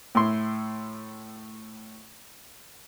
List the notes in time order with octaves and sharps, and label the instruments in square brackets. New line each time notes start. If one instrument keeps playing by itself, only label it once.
[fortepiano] A2 E4 C6